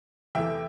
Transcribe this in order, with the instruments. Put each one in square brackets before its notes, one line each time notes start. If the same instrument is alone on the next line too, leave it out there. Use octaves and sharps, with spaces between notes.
[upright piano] E2 C3 E3 A3 E5 G5